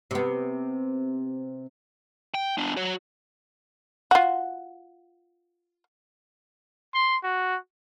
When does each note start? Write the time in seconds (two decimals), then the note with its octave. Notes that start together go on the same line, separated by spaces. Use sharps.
0.11 C3 B3
2.34 G5
2.58 B3 D4
2.77 F#4 C#5
4.11 F4 F#4
6.94 C6
7.24 F#4